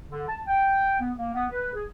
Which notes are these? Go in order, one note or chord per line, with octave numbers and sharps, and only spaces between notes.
D3
A5
G5
B3
A#3
B3
B4
G#4